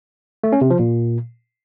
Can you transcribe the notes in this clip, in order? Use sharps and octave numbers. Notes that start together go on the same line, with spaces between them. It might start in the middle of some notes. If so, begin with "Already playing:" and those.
A3
C#4
C3
F3
A#2